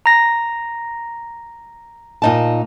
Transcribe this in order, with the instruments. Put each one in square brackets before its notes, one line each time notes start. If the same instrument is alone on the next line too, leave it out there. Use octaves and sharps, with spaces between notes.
[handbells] A#5 A#6
[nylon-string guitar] A#2 D#4 A5